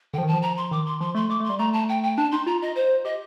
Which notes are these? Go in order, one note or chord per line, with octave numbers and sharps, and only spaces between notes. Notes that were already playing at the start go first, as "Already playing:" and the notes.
D3 F3 G5
D#3 A5
F3
A#5
C6
D#3 D6
C6
F3 C6
A3 C6
A3 D6
A3 C6
G3
A3 A#5
A5
G5
G5
D4 A5
D#4 C6
F4 A#5
D#5
C5
G4 D#5